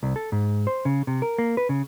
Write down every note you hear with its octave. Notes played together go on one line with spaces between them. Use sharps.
C2
A4
G#2
C5
C#3
C3
A#4
A#3
B4
C#3